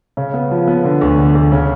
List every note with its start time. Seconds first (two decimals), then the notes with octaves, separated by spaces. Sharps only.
0.17 C#3
0.34 B3
0.51 F3
0.67 B3
0.84 D3
1.01 D2
1.18 D3
1.35 D2
1.52 C#3